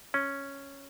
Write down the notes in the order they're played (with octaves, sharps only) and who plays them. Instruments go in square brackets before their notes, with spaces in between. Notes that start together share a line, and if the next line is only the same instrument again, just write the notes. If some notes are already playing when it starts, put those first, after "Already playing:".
[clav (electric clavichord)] C#4